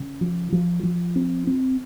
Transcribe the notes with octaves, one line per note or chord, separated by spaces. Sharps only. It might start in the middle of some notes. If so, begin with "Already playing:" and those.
Already playing: C#3
F3
F3
F3
C4
C4